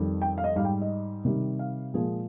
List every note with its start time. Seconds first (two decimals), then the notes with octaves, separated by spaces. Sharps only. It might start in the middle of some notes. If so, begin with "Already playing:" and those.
Already playing: F2 D#3 G3
0.22 G5
0.38 F5
0.44 D#5
0.56 G#2 G3 F5
0.65 G5
0.81 D#5
1.25 C3 D#3 G3
1.59 F5
1.94 A#2 F3 G#3 G#4